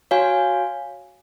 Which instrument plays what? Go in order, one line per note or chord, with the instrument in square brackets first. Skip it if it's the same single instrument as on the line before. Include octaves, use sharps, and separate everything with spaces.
[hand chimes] F#4 C#5 F5 G#5